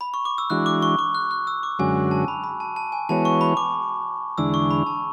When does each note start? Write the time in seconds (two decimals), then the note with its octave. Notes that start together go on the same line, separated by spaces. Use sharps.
0.01 B5
0.14 C#6
0.25 D6
0.38 E6
0.50 E3 G#3 D4 F#4 F#6
0.66 D6
0.82 C#6
0.99 D6
1.15 F#6
1.31 F#6
1.47 E6
1.63 D6
1.79 F#2 D3 G#3 C#4 F#4 G#5
2.11 A5
2.28 B5
2.44 B5
2.60 A5
2.76 A5
2.92 G#5
3.09 E3 G#3 B3 F#4 C#5 A5
3.25 C#6
3.41 B5
3.57 D6
4.38 E2 D3 G#3 D4 E6
4.54 C#6
4.71 B5
4.87 A5